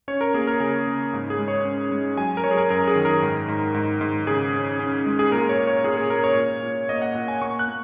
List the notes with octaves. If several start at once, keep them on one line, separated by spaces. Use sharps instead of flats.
C#4 C#5
A#4
A#3 G#4
A#4
C#3 G#4
C#3
G#2
G#4
G#3
C#5
C#4
G#3
F#3 G#5
A#4
F#3 C#5
G#4
A#4
F#2 A#4
G#4
D#3
A#4
G#2
G#2
G#2
G#2
C#3 G#4
C#4
C#4
G#3
G#4
A#2 A#4
C#5
A#2
C#5
A#2 G#4
G#4
A#2 A#4
C#5
A#2
A#2
A#3 D#5
F#5
A#2 F#5
G#5
A#3 C#6
F#6
A#3